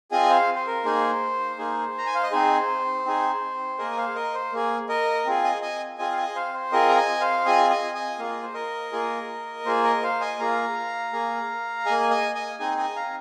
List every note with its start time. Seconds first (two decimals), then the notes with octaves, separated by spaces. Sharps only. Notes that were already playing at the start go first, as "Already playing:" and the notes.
0.11 C4 F4 G#4 D#5 G#5
0.30 C5 F5
0.55 C5
0.67 A#4
0.85 A#3 D#4 G#4 C5
1.58 A#3 D#4 G#4
1.98 A#5
2.07 G#5
2.15 F5
2.23 D#5
2.32 C4 D#4 G#4 C5
3.05 C4 D#4 G#4
3.79 A#3 G#4 A#4 D#5
3.91 G#5
3.97 C5 F5
4.15 A#4 D#5
4.34 C5
4.52 A#3 G#4
4.89 A#4 D#5
5.26 C4 F4 G#4
5.44 D#5 G#5
5.62 D#5 G#5
5.98 C4 F4 G#4 D#5 G#5
6.12 F5
6.17 D#5 G#5
6.35 C5 F5
6.54 C5
6.72 C4 F4 G#4 A#4 D#5
6.89 A#5
6.97 D#5 G#5
7.21 C5 F5
7.46 C4 F4 G#4 D#5 G#5
7.70 D#5 G#5
7.94 D#5 G#5
8.19 A#3 F4 G#4 F5
8.30 D#5
8.43 C5
8.53 A#4 D#5
8.92 A#3 F4 G#4
9.65 A#3 F4 G#4 C5
9.84 A#4 D#5
10.03 C5 F5
10.21 D#5 G#5
10.39 A#3 F4 G#4 F5 A#5
11.13 A#3 G#4
11.86 A#3 G#4 D#5 G#5
12.11 D#5 G#5
12.35 D#5 G#5
12.59 C4 D#4 G#4 D#5 G#5
12.78 D#5 G#5
12.96 F5 A#5